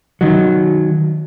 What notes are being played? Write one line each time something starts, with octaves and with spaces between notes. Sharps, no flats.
D#3 F#3